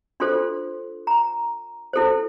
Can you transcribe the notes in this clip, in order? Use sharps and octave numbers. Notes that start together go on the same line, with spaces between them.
D4 F4 A4 C5 C6
A#5
E4 A4 C5